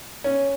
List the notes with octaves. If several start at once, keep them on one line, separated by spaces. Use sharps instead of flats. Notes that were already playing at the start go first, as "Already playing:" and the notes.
C#4